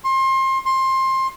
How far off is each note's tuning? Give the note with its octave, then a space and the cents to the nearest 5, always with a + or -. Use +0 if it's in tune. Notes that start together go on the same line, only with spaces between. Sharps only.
C6 +30
C6 +20